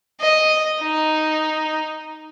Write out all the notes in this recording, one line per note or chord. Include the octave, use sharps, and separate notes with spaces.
D#5
D#4